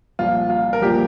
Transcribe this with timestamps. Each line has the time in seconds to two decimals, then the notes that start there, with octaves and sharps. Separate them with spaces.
0.19 C2 A#2 F3 F4
0.50 F4
0.73 A#4
0.81 C2 A#2 F3 G4